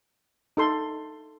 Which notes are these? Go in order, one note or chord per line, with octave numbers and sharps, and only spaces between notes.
D#4 A4 C6